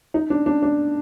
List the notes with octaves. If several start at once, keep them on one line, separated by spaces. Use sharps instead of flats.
D#4
D4
D4
D4